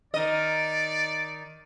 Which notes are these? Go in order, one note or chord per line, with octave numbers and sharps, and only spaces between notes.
D#3 D5 D#5